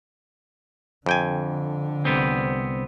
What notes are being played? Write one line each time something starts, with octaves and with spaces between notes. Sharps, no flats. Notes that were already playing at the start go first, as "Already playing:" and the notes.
F2 D3 G5 G#5
C2 B3 C4